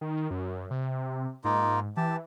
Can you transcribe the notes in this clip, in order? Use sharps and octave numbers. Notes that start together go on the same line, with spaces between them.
D#3
F#2
C3
G#2 A#3 D#4 F4
E3 G4 A5